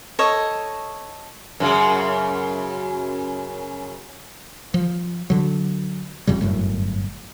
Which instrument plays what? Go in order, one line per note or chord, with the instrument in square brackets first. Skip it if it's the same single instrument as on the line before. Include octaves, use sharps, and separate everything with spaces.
[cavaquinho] A4 C#5 D#5
[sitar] F#2 C#3
[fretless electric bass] F3
D3 F#3
F1 F2 C#3 G3
G1 F#2 A2